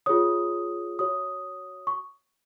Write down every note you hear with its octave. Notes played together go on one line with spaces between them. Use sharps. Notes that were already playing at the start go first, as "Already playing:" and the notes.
F4 G#4 C#5 D#6
F#4 C#5 D#6
C#6